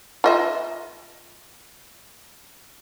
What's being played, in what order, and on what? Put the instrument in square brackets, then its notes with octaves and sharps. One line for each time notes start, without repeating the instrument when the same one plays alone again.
[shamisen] F4 D#5 E5